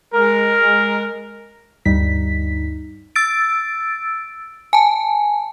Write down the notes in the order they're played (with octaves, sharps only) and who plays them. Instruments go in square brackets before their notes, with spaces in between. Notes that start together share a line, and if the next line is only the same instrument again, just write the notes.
[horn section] G#3 A#4
[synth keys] D2 G2 G3 D#4 B6
[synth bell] E6 A6 D7
G#5 A5